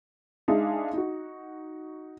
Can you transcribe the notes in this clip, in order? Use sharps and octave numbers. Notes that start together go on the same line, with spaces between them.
G#3 D4 D#4 G#4 E5 F5
D#4 F#4